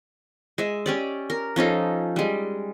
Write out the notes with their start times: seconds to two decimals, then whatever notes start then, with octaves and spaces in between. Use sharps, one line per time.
0.58 G#3 E5
0.86 C#4 G4 D5
1.30 A#4
1.56 F3 C#4 D#4 A4
2.16 G3 G#3